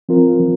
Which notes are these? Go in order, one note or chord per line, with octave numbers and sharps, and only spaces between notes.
F3 C4 F4 A#4
F3